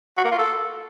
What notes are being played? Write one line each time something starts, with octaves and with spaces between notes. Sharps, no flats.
F#4
A#3
F4
A4